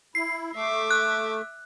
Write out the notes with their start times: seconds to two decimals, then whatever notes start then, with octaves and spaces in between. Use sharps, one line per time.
0.15 E4 C7
0.55 A3 E5 D6
0.91 F#6